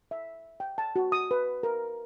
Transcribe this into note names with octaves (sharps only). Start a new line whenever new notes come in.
E5
G5
A5
F#4
D#6
B4
A#4